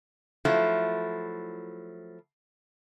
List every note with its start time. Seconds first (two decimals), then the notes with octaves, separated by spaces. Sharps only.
0.45 F3 F#3 A3 E4